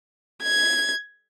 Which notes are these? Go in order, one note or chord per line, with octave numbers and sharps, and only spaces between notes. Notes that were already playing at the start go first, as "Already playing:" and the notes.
G#6